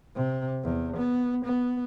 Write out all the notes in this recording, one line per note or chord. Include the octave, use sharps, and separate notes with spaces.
C3
E2
B3
B3